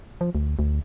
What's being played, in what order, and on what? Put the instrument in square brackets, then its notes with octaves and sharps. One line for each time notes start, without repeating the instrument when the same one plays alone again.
[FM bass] F3
D2
D2